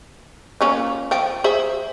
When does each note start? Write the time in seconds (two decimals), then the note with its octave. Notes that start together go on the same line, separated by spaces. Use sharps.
0.61 A#3 C#4 F4
1.11 F3 G5
1.44 G#4 C5 E5